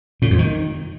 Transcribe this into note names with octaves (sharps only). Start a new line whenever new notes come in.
A2
F2
D#3